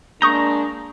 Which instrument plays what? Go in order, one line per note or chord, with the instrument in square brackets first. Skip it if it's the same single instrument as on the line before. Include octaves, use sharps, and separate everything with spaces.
[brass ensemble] G#3 A#3 D4 [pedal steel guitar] A#5 [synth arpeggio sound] C#6 D#6 G6